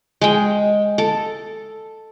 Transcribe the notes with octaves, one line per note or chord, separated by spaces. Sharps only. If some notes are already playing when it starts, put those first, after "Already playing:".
G#3 G5
A4